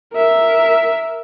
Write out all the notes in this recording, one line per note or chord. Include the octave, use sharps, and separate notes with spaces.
A#4 E5